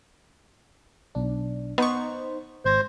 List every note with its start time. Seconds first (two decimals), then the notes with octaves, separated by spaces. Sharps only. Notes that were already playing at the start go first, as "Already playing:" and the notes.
1.15 B1 D4
1.78 B3 D#4 C5 C#6
2.65 G#1 C5 G#6 A#6